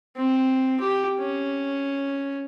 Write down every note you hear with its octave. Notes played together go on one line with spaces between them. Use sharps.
C4
G4
C#4